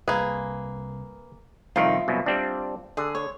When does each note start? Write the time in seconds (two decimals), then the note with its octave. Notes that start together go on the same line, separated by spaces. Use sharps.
0.08 C2 A#3 G#4 B4
1.76 C2 F2 D#3 F4 E5
2.08 C2 F#2 B2
2.26 G3 C4 D4
2.97 D3 G#4
3.15 C#5